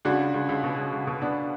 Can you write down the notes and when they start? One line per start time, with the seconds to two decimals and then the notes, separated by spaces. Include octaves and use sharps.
0.05 C#2 D4 F#4
0.19 C#2
0.34 C#2
0.49 C#2
0.64 B2
0.78 C#2
0.93 C#2
1.07 B2
1.22 B2 B3 D4